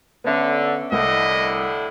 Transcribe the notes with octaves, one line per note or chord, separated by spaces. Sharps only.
D3 B3 C#4 E5
C2 A2 D3 E4 D#5